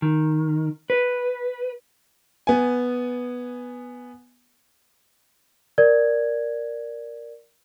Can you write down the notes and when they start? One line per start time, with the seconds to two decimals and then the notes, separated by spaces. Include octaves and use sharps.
0.02 D#3
0.90 B4
2.47 B3 G#5
5.78 A#4 D5 G#6